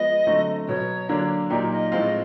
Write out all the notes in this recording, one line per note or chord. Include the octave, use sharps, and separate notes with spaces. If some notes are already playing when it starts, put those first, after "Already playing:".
Already playing: F3 G#3 B3 D#5
D3 F#3 A3 C4
B2 F#3 B3 C#5
D3 F#3 A#3 D4
A#2 F#3 A#3 D#4 G4 D5
D#5
A2 F3 G#3 C4 F4